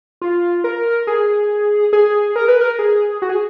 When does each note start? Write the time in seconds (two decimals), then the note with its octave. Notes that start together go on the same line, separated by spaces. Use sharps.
0.21 F4
0.64 A#4
1.07 G#4
1.93 G#4
2.36 A#4
2.48 B4
2.61 A#4
2.79 G#4
3.22 F#4
3.29 G#4